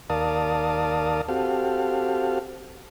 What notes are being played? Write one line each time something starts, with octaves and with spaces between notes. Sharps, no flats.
D#2 A#4 D5 F5 A5 D#6
C4 F#4 G4 A4 F5